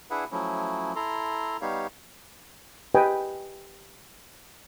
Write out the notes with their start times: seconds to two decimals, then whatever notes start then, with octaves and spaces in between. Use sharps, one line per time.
0.11 D4 E4 G#4 B4 E5 F#5
0.32 F3 F#3 A3 C#4 E4
0.96 E4 A4 A#5 C6
1.61 G3 B3 D#4 G4 C#5 F5
2.94 G4 B4 D#5 G5 G#5